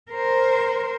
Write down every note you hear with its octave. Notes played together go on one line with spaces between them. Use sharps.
A#4 C5